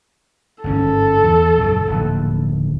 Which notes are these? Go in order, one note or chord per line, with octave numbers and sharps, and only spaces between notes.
G1 G#2 C#4 A4
E2
A#1 F#2 C#3
D1 A#1 D#2